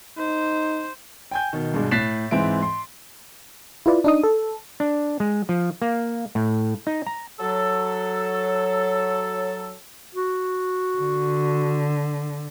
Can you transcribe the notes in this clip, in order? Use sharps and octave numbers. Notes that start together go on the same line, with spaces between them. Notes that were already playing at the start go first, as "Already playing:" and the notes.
D#4 C5
G5 G#5 G6
B2 D#3
G2 B2 G#3 D4
A2 F#6 A6 B6 C7 E7
G#2 E3 C4 E5 D7
C6
E4 F4 B4 D5
D4 D#4 D#6
A4
D4
G#3
F3
A#3
A2
D#4
A#5
F#3 A4
F#4
D3